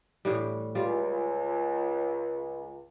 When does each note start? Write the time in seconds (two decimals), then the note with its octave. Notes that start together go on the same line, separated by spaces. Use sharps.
0.25 A2 E3 G3
0.75 C#2 G3 F4